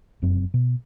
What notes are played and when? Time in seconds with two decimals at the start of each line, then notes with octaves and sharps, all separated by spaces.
0.22 F1 F#2 C4
0.54 B2